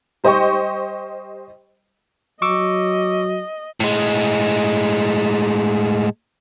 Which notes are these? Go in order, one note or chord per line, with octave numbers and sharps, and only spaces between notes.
G3 C5 D#5 G5 C#6
F#3 D#5 C#6 D6 E6
A2 G#3